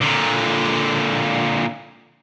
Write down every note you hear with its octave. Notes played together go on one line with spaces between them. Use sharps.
A#2 D3